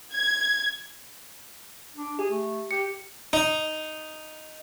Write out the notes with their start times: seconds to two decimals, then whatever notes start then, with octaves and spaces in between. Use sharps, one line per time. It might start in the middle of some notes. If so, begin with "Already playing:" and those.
0.14 G#6
1.96 D4
2.19 G4 G#4
2.31 A3
2.71 G4 C#7
3.33 D#4